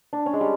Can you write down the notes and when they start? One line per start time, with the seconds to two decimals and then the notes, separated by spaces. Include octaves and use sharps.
0.13 D4
0.26 C#4
0.34 G#3
0.41 G3